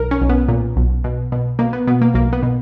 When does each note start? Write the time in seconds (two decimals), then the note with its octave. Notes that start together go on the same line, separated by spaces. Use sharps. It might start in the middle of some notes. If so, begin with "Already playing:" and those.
Already playing: B1 A#4
0.11 C#4
0.21 B1
0.29 B3
0.48 A#2
0.76 B1
1.04 B2
1.32 B2
1.59 B2 A#3
1.73 B3
1.87 B2 B3
2.01 A#3
2.14 B1 A#3
2.33 B3
2.43 B2